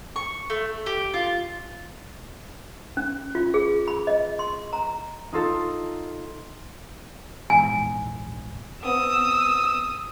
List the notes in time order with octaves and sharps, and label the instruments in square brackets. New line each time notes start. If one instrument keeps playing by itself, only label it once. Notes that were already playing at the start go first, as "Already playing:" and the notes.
[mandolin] C#6
A3
G4
F4
[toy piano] C#4
F4
G#4
B5
D#5
C6
A#5
[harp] D#4 F4 A4
[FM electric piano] A#1 E2 G#2 [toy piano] G#5
[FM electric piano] B3 C4 [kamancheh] D#6 [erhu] E6